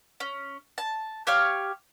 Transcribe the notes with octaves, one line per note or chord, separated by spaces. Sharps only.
C#4
A5
G4 C#5 F5 F6